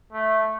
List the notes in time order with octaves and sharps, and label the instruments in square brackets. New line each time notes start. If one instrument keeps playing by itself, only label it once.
[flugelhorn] A3